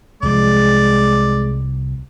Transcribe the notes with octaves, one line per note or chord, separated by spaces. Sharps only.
C2 F3 G#3 D5